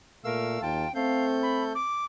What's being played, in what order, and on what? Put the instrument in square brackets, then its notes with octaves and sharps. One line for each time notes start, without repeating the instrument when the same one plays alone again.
[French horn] A#2 [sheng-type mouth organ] A3 F5 E6 [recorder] A#4
[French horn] D#2 [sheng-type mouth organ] F4 A5 [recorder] G5
[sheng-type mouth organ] A3 A4 G6 [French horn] C4 [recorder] F5
[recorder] B5
D6